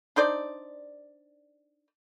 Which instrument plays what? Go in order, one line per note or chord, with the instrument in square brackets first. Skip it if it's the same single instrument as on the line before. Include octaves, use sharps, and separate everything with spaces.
[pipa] D4 D#4 C5 D5